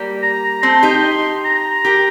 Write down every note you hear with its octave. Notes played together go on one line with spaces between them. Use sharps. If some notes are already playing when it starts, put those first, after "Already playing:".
Already playing: G3 A#3
A#5
A3 C4 C6
D#4 G4
A#5
G4 A#4